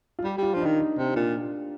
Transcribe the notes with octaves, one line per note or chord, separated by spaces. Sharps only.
F4
G3 G4
G3 F4
F3 D4
D#3 D#4
D#4
C3 D#4
A#2 D4